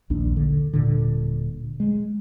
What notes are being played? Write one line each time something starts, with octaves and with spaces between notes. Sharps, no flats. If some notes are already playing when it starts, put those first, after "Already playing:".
A#1 D#2 D4
D3
D#1 A#2 D3
G#3